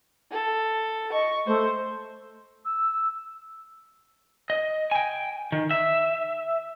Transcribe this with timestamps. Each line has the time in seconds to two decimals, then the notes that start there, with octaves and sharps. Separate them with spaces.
0.32 A4
1.13 D#5 C#6
1.46 A3 C5
2.65 E6
4.50 D#5
4.91 G5 G#5
5.52 D#3
5.71 E5